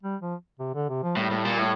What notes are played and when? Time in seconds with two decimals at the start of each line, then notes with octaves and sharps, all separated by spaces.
0.03 G3
0.22 F3
0.59 C3
0.75 D3
0.89 C3
1.03 F3
1.17 A2 G3
1.31 A2
1.45 A#2
1.59 A2